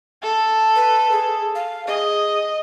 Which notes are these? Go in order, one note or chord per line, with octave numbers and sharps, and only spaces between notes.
A4
B4
G#4
F5
G#4 D#5